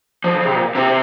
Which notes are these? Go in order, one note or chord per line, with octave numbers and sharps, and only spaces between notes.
F3
C#3
C3
A#2
C3